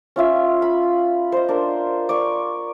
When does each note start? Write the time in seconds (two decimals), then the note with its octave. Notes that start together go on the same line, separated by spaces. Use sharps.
0.16 C#4 F4 E5 F5
0.62 B5
1.32 C5 D#5
1.48 D4 A#4
2.09 D5 C#6